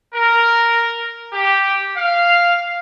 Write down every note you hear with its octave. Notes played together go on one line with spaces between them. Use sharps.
A#4
G4
F5